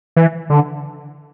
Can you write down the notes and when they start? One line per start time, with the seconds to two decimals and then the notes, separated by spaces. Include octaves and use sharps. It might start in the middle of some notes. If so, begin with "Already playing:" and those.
0.16 E3
0.50 D3